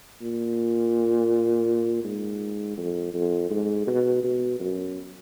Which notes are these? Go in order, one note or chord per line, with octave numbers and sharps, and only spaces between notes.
A#2
G#2
F2
F2
G#2
B2
B2
F#2